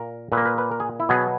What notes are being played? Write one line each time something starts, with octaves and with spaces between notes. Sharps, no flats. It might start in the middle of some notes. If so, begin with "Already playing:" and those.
Already playing: A#2 A#4
A#2 B4
A#3
B4
B4
A#4
G#4
E4
B2 F#3 B3 G#4